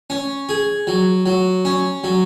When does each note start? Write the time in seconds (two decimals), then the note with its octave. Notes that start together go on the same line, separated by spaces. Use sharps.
0.10 C#4
0.49 G#4
0.87 F#3
1.26 F#3
1.65 C#4
2.04 F#3